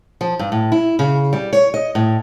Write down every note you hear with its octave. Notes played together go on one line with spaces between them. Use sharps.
F3
G2
A2
E4
C#3
G3
C#5
D#5
A2